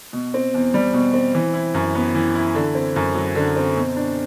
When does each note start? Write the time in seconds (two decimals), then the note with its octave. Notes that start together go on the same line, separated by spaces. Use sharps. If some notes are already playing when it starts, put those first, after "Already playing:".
0.13 B2
0.34 C4
0.54 E2
0.74 G3
0.93 B2
1.14 C4
1.35 E3
1.54 E4
1.74 F#2
1.95 B3
2.14 E3
2.35 E4
2.55 D3
2.75 C4
2.96 F#2
3.15 F#3
3.35 D3
3.56 C4
3.76 B2
3.96 D4